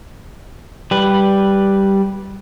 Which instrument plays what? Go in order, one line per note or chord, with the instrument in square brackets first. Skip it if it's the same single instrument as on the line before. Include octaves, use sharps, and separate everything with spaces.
[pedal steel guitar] G3 B4